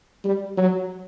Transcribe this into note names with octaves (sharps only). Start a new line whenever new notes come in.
G3
F#3